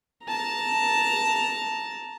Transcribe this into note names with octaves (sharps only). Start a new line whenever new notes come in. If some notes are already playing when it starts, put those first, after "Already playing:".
A5 A#5